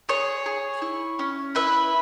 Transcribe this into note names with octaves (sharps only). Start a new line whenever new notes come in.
G#4 C#5
G#4
E4
C#4
E4 B4 E5